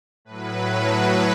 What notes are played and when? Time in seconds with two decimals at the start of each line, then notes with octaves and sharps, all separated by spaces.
0.25 A2 F#3 B4
0.92 B4